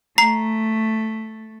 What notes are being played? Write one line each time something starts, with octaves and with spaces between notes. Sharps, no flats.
A3 A#5 C7